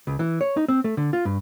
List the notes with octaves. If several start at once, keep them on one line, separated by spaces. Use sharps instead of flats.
C#2
E3
C#5
D#4
C4
A3
D3
F4
G2